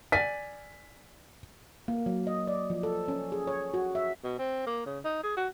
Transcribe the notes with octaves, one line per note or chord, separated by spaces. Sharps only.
D5 G#5 B6
A#3
F#3
D#5
D5
F3
A4
C#4
G#4
C#5
F#4
E5
B2
C4
A#3
C#3
D#4
G#4
F#4